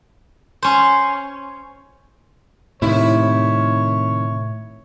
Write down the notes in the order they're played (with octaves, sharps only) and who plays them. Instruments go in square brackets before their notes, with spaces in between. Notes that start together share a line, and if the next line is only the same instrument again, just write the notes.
[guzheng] C#4 C5
[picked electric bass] A2 [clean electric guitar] C3 D#3 [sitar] E4 [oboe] C#5